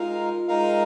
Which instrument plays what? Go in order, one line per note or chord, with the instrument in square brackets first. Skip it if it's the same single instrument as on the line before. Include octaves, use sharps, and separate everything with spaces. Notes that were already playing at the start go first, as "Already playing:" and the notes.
Already playing: [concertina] G#3 D#4 A#4 F5 [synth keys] F4
[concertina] G#3 D#4 A#4 F5